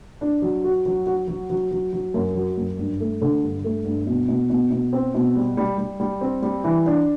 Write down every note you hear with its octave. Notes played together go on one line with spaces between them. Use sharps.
D4
F#3
F#4
F#3
F#4
F#3
F#3
F#3
F#3
F#2
F#3
F#2
G2
A3
D3
G2
A3
G2
B2
B2
B2
B2
C4
B2
G3
G3
G3
G3
C4
G3
E3
D4